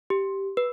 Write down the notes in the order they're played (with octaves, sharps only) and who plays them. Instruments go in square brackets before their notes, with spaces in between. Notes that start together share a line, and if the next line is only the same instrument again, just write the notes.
[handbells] G4
B4